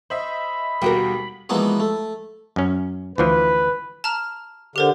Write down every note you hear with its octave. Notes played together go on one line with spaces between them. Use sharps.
C5 D#5 E5 B5
D#2 B2 G3 F#4 A#4 G5
E3 F3 G#3 A#3 B3 F#4
A3
F#2 C#4
D2 E3 F3 B4
A5 A#5 F6
D3 G4 A#4 C5